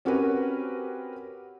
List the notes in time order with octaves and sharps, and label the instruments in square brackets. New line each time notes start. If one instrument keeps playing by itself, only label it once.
[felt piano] C4 C#4 F#4 G4 A#4 B4